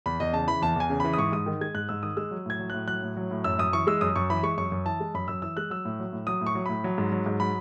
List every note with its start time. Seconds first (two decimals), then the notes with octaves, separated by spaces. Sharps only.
0.06 E2 B5
0.20 E2 D#5
0.33 C#3 A5
0.48 E3 B5
0.62 E2 A5
0.76 E2 G#5
0.90 C#3
1.00 E3 B5
1.13 D#6
1.18 G#2 C#6
1.32 G#2 D#6
1.46 D#3
1.61 G#3 G#6
1.74 G#2 F#6
1.89 G#2 E6
2.03 D#3 D#6
2.17 G#3 E6
2.31 F#3
2.46 A2 G#6
2.60 F#3
2.70 A2 F#6
2.88 F#3 F#6
3.03 A2
3.17 F#3
3.31 A2
3.44 F#2 E6
3.59 F#2 D#6
3.73 E3 C#6
3.87 G#3 E6
4.01 F#2 D#6
4.16 F#2 C#6
4.30 E3 B5
4.43 G#3 C#6
4.57 F#2 C#6
4.72 F#2
4.86 E3 A5
5.00 G#3
5.14 F#2 B5
5.28 F#2 E6
5.42 E3 E6
5.57 G#3 F#6
5.70 F#3 E6
5.85 A2
6.00 F#3
6.13 A2
6.27 F#3 D#6
6.41 A2
6.47 C#6
6.55 F#3
6.66 A2 B5
6.84 F#3
6.98 G#2
7.12 F#3
7.26 G#2
7.40 F#3 B5